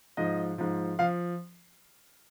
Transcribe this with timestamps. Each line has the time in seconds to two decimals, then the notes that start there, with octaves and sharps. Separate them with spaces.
0.17 G#2 F3 D#5
0.58 G#2 F3
0.99 F3 F5